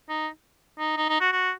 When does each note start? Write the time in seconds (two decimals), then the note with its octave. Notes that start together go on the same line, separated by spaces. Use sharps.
0.09 D#4
0.79 D#4
0.97 D#4
1.09 D#4
1.20 F#4
1.32 F#4